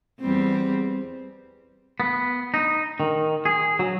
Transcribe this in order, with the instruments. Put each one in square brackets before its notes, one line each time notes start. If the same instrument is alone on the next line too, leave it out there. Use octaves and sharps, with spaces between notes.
[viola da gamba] E2 G3 C4
[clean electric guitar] B3
D#4
D#3
G#4
F#3